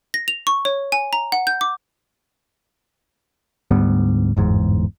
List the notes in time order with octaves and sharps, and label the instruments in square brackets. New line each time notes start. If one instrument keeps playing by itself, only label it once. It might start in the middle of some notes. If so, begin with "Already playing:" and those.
[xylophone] A#6
F7
C#6
C#5
G#5
A#5
F#5
G6
D6
[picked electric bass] D2 G#2 G3 B3
G1 E2 G#2